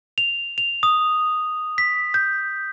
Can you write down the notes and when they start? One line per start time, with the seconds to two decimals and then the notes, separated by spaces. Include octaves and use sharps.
0.18 F7
0.58 F7
0.83 D#6
1.78 B6
2.14 G6